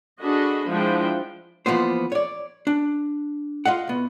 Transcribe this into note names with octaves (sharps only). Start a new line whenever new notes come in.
D4 F#4 G#4 A4 D#5 B5
F3 G#3 D4 E4 F#5 G5
E3 F3 A#3 B3 C5
C#5 D5
D4
F4 D#5 F5 F#5
C2 B3